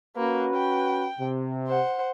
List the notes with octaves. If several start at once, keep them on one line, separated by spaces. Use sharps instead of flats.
A#3 C#4 F#4 B4
G5
C3
C5 F#5